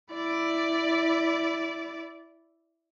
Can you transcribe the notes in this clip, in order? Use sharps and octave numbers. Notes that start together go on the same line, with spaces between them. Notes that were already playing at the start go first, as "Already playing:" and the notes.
E4 D5